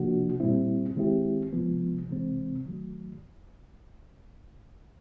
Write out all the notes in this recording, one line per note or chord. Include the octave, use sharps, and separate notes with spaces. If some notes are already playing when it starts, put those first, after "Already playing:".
Already playing: C3 F3 A#3 D4 F#4
A#2 G3 C4 E4
D#3 G#3 C4 E4 G4
C3 F3 G#3 B3
C3 E3 G#3 C4
D#3 F#3 A3